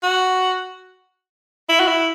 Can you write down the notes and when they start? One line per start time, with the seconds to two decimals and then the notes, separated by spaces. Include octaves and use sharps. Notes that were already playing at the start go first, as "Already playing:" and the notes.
0.03 F#4
1.70 E4
1.80 F#4
1.88 E4